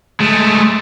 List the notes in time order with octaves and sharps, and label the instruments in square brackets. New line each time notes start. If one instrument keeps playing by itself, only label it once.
[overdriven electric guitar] G#3 A3